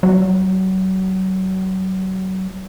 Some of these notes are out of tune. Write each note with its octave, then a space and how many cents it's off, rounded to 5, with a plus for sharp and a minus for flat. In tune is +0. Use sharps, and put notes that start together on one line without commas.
F#3 +30